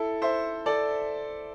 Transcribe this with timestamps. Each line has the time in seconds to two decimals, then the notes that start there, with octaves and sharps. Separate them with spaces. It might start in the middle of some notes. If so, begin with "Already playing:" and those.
Already playing: E4 A4
0.22 C5 E5
0.66 A4 D5